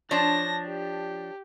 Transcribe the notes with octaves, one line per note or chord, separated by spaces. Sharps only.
F3 D4 C#5 D5 A5 A#6
G4